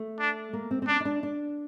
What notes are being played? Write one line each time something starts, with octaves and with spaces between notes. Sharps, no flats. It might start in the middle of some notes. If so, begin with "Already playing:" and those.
Already playing: A3
D4
A#3
C4
C4
C#4 D4
D#4
D4
D4